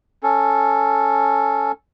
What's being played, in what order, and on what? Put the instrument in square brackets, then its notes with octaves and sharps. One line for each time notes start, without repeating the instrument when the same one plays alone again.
[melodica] C#4 A4